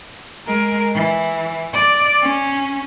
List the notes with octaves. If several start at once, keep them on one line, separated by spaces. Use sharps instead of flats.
G#3 A#4
E3
D5
C#4